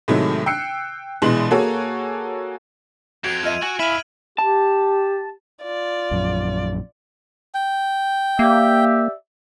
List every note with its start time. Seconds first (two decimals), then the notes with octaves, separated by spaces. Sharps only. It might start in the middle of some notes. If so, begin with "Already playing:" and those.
0.08 A2 C3 D#3 F#3 G#3 A3
0.46 G5 E6 F#6 C7 C#7
1.22 A#1 B2 E3 G#3 C6 F#7
1.51 A#3 F#4 G#4 A4 C#5 G#5
3.24 F2 F#4 G#6 D7 F7
3.43 F4 D#5 E5 E6 D#7
3.62 F#4 G#5
3.79 E4 E5 F5 F6 D#7 F#7
4.38 G4 A5
5.63 F4 D5
6.11 A#1 F#2
7.55 G5
8.39 A#3 G4 D5 E5